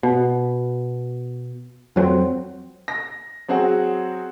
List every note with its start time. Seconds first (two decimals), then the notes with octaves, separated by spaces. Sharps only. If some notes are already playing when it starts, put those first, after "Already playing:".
0.03 B2
1.96 F2 F#3 A3 C4
2.88 A#6
3.48 F#3 C4 F#4 G#4